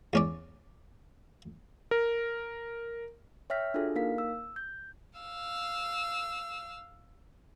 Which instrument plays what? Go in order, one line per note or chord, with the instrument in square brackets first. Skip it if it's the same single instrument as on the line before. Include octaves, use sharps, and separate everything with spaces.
[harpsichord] E2 C#4 D5
[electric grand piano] A#4
[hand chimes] C#5 E5 G5 F6 B6
D4 F4 F#4 G#4 A4
A#3 D#4 A#4 F5 B6
E6
G6
[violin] F5 E6